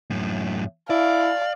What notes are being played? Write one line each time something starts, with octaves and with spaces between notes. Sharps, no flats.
F#2 A2
E4 D5 F5